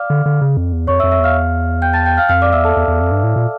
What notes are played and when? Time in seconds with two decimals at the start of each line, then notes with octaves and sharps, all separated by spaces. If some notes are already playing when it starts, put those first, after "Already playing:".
Already playing: D5 F5 D6 F6
0.10 D3
0.26 D3
0.41 C#3
0.57 F2
0.73 E2
0.87 F2 C#5 C#6
0.99 E5 E6
1.03 F2
1.11 E5 E6
1.20 E2 F5 F6
1.82 G5 G6
1.93 A5 A6
2.06 G5 G6
2.17 F5 F6
2.29 F2 F5 F6
2.42 D5 D6
2.53 E2 E5 E6
2.64 A4 A5
2.77 E2
2.88 E2
3.01 F2
3.11 G2
3.23 A2
3.36 A#2